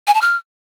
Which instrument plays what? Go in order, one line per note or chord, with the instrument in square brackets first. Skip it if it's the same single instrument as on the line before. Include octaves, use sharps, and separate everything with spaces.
[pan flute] G#5
A5
F6